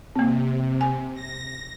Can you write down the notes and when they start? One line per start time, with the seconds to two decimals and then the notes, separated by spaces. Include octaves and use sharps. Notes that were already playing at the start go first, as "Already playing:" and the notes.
0.16 C3 A#3 C4
0.81 G#5
1.14 A#6